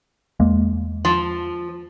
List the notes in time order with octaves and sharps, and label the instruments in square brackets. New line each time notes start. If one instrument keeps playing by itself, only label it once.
[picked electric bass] E2 G#3 A#3
[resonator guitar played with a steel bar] F3